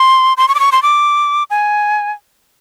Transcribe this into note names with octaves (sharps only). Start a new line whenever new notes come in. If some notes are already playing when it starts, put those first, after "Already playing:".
Already playing: C6
C6
C#6
D6
C#6
C6
D6
G#5